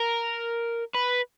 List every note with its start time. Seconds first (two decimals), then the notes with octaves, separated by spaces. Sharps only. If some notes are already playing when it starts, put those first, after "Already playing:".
Already playing: A#4
0.95 B4